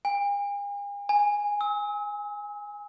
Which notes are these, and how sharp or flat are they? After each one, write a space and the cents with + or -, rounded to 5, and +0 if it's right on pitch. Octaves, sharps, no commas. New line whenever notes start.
G#5 -45
G#5 -10
E6 -45